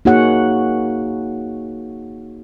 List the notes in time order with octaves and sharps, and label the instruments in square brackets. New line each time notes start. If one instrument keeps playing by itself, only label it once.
[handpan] A#3 D#4 F#4 G#4 C#5 F#5